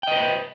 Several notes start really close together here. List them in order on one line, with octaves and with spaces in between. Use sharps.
G5 D#5 B4 C5